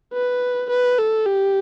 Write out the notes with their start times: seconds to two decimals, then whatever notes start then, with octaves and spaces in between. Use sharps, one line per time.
0.14 B4
0.70 B4
0.99 A4
1.26 G4